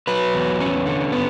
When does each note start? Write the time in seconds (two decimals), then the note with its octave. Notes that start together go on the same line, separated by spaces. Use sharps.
0.07 F#3 B4
0.34 E2
0.61 C#4
0.86 D3
1.12 B3